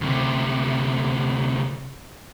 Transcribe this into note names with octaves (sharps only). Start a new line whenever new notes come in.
D2 C3